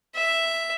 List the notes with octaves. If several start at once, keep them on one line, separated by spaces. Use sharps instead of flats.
E5